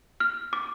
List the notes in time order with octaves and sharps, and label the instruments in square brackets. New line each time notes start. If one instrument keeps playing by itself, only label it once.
[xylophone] F6
D6